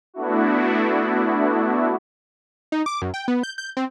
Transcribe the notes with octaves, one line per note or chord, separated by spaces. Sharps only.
A3 B3 D4 E4 F#4
D#4
D6
F#2
G5
B3
G6
G6
C4